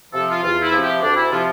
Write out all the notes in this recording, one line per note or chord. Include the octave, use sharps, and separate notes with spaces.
C3 F3 A4
F4
E2 F4
E4
C3 F3
G4
D2 D4
E4
C3 F3 F4